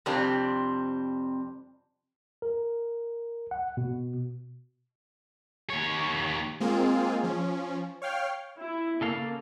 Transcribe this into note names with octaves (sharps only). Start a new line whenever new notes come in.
F2 C3 G3 C4 D4
A#4
F#5
B2
D#2 C#5
G#3 A#3 C4 F4 G#4
F3 C#4
C#5 F5 G5 F6
E4
C#3 A#3 A4 F5